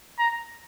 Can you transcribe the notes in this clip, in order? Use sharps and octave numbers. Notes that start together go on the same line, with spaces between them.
A#5